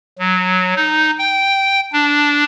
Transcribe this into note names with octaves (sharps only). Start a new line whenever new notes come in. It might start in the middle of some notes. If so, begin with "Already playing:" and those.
F#3
D#4
G5
D4